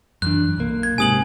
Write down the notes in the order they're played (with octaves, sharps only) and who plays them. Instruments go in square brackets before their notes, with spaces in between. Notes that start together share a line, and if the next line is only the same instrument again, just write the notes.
[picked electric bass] F#2 E3 D4 [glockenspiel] F#6
[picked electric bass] B1 A#3
[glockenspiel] G#6
[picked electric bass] G#2 C3 [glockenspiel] G#5 D#6 F#7